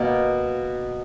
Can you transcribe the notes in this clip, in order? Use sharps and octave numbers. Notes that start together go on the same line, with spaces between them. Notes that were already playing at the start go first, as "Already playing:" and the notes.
Already playing: B2 A#3